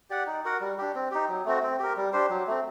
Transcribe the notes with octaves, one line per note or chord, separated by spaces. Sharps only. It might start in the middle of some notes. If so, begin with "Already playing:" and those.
G4 D5 F#5
D#4
F#4 A#4 F#5
G3
D4 G4
C4
D#4 G4
F#3
A3 C4 F#4
C4
G4 A#4
G3
D4 G4 C5
F#3
A3 C4